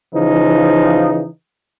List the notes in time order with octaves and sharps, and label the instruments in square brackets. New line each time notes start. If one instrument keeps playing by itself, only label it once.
[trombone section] C#3 E3 F3 D#4